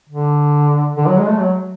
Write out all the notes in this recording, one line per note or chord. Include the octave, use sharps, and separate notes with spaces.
D3
D3
F#3
G#3
A3
F#3